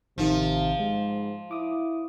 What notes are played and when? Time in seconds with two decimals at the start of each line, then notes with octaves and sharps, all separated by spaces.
0.18 A1 C3 D#3 F3
0.79 G#2 G#3
1.51 E4 D6 D#6